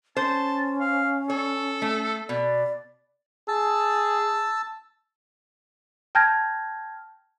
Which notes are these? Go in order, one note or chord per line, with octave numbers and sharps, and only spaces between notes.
C#4 C5 A5
F5
A4 C#5
A3
B2 D5
G#4 A5 E6
G5 A5 F6 G6 G#6 A#6